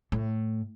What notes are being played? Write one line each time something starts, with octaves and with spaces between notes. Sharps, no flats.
A2